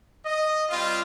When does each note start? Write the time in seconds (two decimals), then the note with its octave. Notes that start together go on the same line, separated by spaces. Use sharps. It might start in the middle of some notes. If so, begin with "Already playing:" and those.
0.26 D#5
0.69 G3 C4 F4